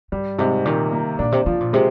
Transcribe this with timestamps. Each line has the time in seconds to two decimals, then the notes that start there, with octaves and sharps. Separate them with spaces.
0.12 G2 G3
0.38 G#2 C3
0.65 A#2 D#3
0.92 A#3
1.19 A#2 D4
1.32 C3
1.46 C3 F3
1.60 A#2
1.73 C3 G#3